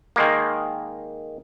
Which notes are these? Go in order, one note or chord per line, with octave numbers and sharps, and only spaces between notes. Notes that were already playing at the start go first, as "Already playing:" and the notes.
D#3 G#3 A#3